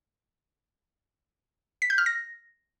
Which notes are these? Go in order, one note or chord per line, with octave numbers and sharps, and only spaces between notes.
B6
G6
F6
A#6